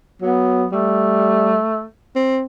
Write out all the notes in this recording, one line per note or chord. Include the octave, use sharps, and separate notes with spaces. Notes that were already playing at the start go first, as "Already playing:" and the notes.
F#3 B3
G3 A3
C4